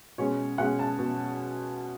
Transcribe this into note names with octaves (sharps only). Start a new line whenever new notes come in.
B2 G#3 C#4 C#5
B2 G#3 C#4 F#5
A5
B2